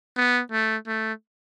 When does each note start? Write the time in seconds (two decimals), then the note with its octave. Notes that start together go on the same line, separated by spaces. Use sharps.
0.17 B3
0.52 A3
0.88 A3